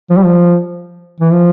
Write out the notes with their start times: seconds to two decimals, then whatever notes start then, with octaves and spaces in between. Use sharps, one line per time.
0.10 F3
0.17 G3
0.25 F3
1.20 E3
1.33 F3